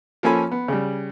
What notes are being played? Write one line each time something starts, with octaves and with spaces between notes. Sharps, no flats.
F3 A#3 C#4 A4 G#5 B5
B3
C#3 G3